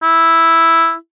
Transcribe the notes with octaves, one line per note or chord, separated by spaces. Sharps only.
E4